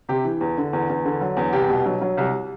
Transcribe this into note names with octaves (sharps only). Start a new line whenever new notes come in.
C3 G4
E3
E2
D3
E2
E2
D3
F#3
E2
C2 G4
B2
F#3
F#3
C2